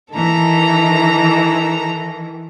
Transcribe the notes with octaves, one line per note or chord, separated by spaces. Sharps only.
D#3 E3 A4 A#5